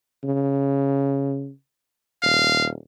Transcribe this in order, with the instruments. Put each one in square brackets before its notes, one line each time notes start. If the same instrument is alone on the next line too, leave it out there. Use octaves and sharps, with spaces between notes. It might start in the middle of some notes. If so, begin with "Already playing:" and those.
[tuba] C#3
[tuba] D#1 [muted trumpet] F5